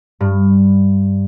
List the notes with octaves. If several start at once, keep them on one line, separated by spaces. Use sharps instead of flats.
G2